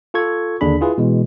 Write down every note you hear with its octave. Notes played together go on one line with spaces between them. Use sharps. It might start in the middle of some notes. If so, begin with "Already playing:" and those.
F4 A4 C#6 G#6
D#2 D3 D4 G#4 B5
E4 F4 G#4 B4
B2 E3 G#3